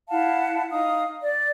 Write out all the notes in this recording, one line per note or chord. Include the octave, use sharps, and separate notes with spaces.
E4 F5 F#5 A5
D#4 F5 D#6
D5